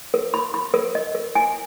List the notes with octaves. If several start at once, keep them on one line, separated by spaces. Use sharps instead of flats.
A#4
B5
B5
A#4
D#5
A#4
G#5